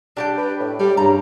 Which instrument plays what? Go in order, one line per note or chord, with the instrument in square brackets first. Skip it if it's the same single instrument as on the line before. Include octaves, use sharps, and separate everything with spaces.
[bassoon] G3 [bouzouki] D4 G4 G5
[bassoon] B4
A2
[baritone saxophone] G3 [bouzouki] D5
[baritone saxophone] G2 [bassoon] C#3 [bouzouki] A#5